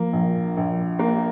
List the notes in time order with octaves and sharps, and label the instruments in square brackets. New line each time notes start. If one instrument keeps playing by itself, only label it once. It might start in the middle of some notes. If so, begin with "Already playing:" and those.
Already playing: [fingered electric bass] F3 [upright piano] A#3
[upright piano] A#1
A#1
A#3